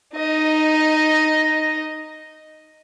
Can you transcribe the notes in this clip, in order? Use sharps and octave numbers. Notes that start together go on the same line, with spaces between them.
D#4 D#5